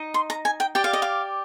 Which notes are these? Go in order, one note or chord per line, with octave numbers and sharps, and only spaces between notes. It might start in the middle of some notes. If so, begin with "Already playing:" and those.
Already playing: D#4 D#5
C6
A#5
G#5
G5
G4 D5 G5
F5
D#5
F5